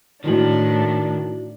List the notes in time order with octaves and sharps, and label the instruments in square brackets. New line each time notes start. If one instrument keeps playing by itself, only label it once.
[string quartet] A2 [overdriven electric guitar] D#3 [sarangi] D4 [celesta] E4 F#4 F#7